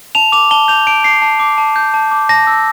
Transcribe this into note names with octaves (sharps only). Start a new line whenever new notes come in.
A5 F7
D6 F7
A5 G7
G6 F7
A5 D7
D6 C7
A5
D6
A5
G6
A5
D6
A5 A#6
E6